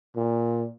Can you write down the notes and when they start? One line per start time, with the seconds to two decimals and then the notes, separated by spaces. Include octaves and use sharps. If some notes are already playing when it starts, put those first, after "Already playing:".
0.16 A#2